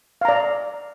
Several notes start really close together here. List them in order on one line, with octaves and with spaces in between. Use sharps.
F5 A#5 D5